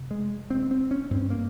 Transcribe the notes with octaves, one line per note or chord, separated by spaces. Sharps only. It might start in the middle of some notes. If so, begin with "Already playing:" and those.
Already playing: F2 C3
G#3
C4
C4
C#4
G2 C4
A#3